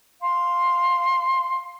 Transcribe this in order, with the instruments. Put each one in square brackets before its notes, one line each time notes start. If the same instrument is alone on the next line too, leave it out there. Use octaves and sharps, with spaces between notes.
[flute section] F5 C6